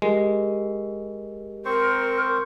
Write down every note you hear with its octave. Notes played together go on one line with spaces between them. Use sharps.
G#3 G4 A#4
C4 A#4 C5 C#6